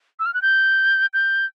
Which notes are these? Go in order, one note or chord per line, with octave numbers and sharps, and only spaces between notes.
E6
F6
F#6
G6
G6